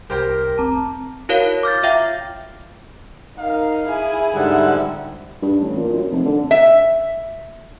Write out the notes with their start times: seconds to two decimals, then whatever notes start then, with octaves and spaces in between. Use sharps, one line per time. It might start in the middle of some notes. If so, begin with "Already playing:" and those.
0.10 C2 G4 A#4 C5 G5
0.58 F1 C4 A5 A#5 D6
1.29 E4 F#4 A#4 C#5 F5
1.43 C#5
1.63 D6 F6 G6 A6
1.83 F4 E5 F5 G5
3.38 D#4 A#4 F5
3.89 E4 G#4 G#5
4.35 G#2 D3 G3 E5 F#5
5.42 G2
5.62 A1
5.77 A#2
5.94 F#2
6.11 F1
6.25 D3
6.51 E5